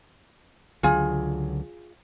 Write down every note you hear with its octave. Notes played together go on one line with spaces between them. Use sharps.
C#2 D3 F#3 F4 G#4